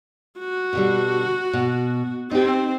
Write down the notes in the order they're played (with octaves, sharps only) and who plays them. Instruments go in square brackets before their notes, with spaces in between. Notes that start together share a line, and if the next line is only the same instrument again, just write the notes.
[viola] F#4
[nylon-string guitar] B2 D3 G3
B2
[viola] C4 [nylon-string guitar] D#4 G4